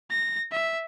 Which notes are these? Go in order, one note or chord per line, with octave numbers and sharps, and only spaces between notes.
A#6
E5